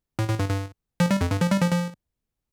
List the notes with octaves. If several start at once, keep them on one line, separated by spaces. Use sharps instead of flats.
A2
A2
G2
G2
F3
G3
F2
G2
F3
G3
F3
F3